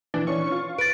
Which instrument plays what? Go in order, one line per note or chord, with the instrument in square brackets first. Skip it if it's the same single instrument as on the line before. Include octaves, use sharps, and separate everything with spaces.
[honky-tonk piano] E3 [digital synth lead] D4
[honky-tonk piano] E3 C#4 D4 [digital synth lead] C#6
[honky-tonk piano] F4
[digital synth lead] B4 [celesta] A6 D7